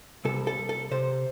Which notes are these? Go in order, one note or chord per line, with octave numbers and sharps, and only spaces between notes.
C2 A4
A4
C2
A4
C3 C5